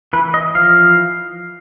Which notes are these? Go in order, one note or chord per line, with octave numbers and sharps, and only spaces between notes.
E3 B4
D#5
F3 F5